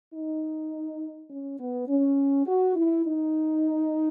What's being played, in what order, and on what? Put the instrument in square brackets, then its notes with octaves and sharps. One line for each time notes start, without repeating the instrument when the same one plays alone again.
[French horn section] D#4
C#4
B3
C#4
F#4
E4
D#4